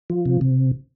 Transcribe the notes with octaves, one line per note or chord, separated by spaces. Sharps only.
F3
C3
C3